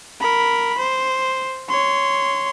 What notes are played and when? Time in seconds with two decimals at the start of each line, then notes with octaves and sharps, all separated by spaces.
0.20 A#4 B5
0.78 C5
1.69 C#5 C6